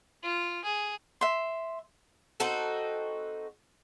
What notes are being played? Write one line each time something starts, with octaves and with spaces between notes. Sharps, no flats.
F4
G#4
E5 C6
C4 D#4 F#4 A4